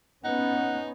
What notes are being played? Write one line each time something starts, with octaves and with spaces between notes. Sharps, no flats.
B3 C#4 D#4 F#5